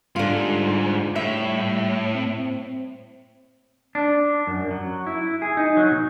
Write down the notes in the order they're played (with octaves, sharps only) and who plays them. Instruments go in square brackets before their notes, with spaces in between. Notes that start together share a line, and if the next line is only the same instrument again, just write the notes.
[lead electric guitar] G#2 [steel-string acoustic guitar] D3 F4 [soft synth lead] G3
[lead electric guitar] A2 [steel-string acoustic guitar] E5
[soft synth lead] C4
[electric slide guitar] D4
F#2
F#3
E4
G#4
D#4
F#3
B2